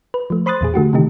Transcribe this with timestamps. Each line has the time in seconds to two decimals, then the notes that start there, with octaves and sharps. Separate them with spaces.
0.14 B4
0.30 F3 A3
0.46 C5 B5 C6 D#6 F#6 A6
0.61 E2 A#2 G#4
0.74 D3 A3 F#4 G4
0.93 C3 D#3 E3 A3 D#4 G4